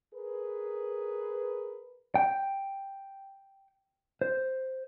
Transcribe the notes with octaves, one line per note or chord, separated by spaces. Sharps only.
G#4 A#4 B4
G5
C5